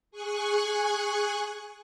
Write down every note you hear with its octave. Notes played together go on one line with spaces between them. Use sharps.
G#4 G#5 C#6 F#6